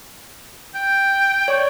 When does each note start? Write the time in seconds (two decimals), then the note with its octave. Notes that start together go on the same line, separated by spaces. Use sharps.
0.75 G5
1.48 C#5 D5 C#6